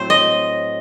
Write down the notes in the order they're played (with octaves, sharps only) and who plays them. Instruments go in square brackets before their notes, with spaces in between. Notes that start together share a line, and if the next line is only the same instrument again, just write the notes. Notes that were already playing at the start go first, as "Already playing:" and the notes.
Already playing: [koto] A2 F#3 A3 C4 C5
D#5